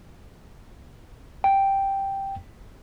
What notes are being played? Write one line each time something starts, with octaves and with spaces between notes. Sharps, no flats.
G5